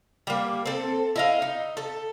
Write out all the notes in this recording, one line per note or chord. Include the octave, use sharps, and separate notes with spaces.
G3 A#3
C4 A4
E4 D#5 F5
D#4
A4